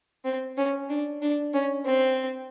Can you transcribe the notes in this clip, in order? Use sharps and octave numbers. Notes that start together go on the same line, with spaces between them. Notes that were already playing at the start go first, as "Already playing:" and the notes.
C4
C#4
D4
D4
C#4
C4